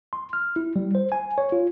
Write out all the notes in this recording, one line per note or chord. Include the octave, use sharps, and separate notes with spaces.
C6
F6
E4
G3
C5
G#5
C#5
F4